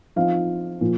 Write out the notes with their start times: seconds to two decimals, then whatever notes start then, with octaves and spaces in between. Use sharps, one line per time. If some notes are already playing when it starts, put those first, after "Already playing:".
0.16 F3 C4 D#4 F5
0.81 A#2 F3